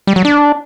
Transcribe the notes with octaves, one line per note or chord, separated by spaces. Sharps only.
G3
F#3
D4